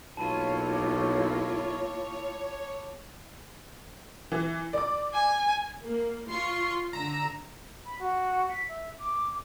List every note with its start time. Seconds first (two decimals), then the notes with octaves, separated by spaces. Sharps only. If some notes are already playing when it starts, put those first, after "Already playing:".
0.17 B1 A#3 E4 F4 C#5 A5 B5 D#7
0.73 D6
4.32 E3
4.73 D5 D6
5.14 G#5
5.83 A#3
6.28 F4 C6 C#6
6.93 D3 A#5 E6
7.86 B5
7.99 F#4
8.49 B6
8.69 E5
8.99 D6